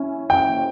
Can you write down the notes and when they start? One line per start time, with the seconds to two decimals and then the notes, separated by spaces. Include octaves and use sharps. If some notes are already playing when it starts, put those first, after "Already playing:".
Already playing: C#4 E4
0.30 G5